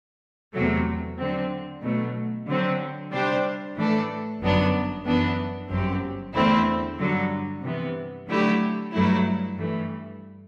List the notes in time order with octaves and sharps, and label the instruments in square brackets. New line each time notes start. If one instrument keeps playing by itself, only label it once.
[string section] E2 C3 F#3 A3
D3 F#3 C4
B2 F#3 A3
D3 F#3 C4
C3 G3 D4 G4 C5
A2 E3 A3 D4 A4
G1 F#2 F#3 B3 D4
F#2 E3 B3 D4
G1 F#2 F#3 C4 G4
E2 D3 A3 C4 E4
G2 D3 F#3
C3 E3 B3
D3 F#3 A3 E4 G4
G2 F#3 A3 E4
G2 E3 A3